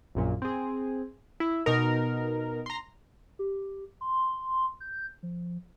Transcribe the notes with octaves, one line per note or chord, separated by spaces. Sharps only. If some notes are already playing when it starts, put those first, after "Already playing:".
A#1 F#2 A#2
C4 G#4
E4
B2 D#4 A#4
A#5 C6
G4
C6
G6
F3